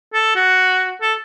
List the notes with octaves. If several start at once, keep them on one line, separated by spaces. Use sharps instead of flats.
A4
F#4
A4